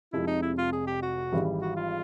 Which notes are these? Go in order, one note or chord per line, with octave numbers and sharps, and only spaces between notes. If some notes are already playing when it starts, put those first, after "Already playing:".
F1 F2 C3 F3 G#3 E4
D#4
E4
F4
G#4
G4
F#4
G#1 G#2 E3 G3
F#4
F4